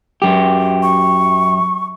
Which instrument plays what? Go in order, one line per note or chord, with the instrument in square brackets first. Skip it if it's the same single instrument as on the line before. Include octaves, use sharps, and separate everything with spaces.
[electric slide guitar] F#2 G4
[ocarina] C#6